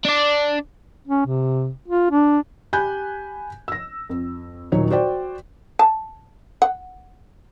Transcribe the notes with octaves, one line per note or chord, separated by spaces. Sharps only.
D4 D5
C#4
C3
F4
D4
G4 G#5 B5 F#6 G6
E6 A#6
F2
D#1 F#3 D#4 C#5
F#4 C5 D5 G5
A5
F#5